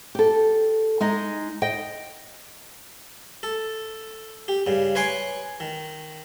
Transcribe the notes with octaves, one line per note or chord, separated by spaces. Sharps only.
G4 A4
G#3 D#4 D#5
D#5 G5
A4
G4
G2 C#3
B4 C#5 G#5 C6 D6
D#3